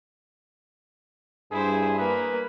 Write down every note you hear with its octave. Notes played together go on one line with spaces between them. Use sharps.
G2 E4 G#4 C5
A#3 B4